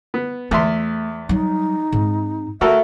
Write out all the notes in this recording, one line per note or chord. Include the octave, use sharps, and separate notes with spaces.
B3
E2 A3 E5 C6
F#3 G3 D#4
G#2 C4
A3 F#4 A4 A#4 E5